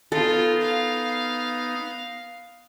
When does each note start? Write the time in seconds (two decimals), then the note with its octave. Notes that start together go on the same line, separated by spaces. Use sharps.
0.12 B3 D#4 F4 A4
0.61 F5